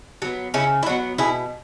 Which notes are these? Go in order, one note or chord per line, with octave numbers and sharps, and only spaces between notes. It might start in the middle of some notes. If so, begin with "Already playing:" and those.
F#3 B3
C#3 C#4 E4
E4
F#3 B3 D4 F#4
B2 E4 G#4